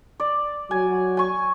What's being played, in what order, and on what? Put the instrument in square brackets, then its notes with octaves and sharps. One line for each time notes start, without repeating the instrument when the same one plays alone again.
[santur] D5
[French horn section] F#3 F#4 [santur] G#5
[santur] G#5 C#6